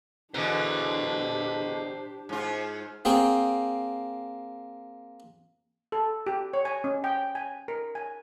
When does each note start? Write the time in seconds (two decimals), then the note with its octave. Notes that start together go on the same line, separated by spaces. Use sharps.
0.34 E2 B2 D3 D4 G4 C5 A#5
2.29 G#2 F4
3.05 A#3 C4 G#4 G5
5.92 A4
6.27 G4
6.54 C#5
6.65 G#5
6.84 C#4
7.04 G5
7.35 G#5
7.68 A#4
7.95 G#5